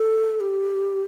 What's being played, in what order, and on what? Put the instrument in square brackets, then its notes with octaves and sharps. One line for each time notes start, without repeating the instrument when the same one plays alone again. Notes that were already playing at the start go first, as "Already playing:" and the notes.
Already playing: [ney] A4
G4